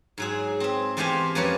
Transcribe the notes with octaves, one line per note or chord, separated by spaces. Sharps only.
G#2 F#3 G#4
C4 E5
E2 A3 G4 C5 F5 G#5
F2 A#3 C#4 A#4 B4 C#5